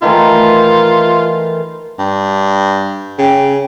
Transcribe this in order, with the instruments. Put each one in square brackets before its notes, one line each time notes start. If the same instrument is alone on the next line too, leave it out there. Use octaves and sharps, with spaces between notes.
[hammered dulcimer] D#3 E3 A3 [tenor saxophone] F4
[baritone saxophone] G2
[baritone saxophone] C#3 [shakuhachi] G5